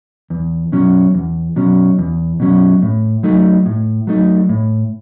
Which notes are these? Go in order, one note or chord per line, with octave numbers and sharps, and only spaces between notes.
E2
B2 F#3 C#4
E2
B2 F#3 C#4
E2
B2 F#3 C#4
A2
F#3 A3 D#4
A2
F#3 A3 D#4
A2